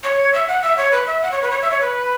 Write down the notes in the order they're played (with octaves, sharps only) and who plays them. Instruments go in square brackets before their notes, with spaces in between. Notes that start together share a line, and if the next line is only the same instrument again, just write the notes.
[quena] C#5
E5
F#5
E5
C#5
B4
E5
F#5
C#5
B4
C#5
E5
C#5
B4